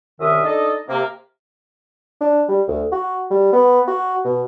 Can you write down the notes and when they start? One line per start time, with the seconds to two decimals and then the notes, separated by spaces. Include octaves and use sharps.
0.19 C2 F#2 D#3 E5 D#6
0.44 D4 D#4 A4 D#5
0.88 C3 A#3
2.21 D4
2.49 G3
2.68 D2
2.92 F#4
3.31 G3
3.53 B3
3.88 F#4
4.25 B2